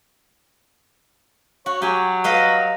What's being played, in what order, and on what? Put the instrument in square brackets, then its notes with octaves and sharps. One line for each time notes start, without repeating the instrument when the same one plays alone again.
[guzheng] F#4 [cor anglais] C#5
[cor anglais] F#3 [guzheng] G4 G#5
[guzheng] B4 D#5 F5